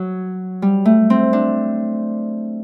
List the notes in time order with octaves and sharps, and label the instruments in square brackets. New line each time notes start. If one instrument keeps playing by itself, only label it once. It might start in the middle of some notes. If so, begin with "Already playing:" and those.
Already playing: [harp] F#3
G3
A3
C4
D4